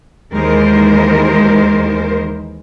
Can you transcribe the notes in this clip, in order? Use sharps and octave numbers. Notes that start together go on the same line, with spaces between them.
D#2 E3 G#3 A#4 C5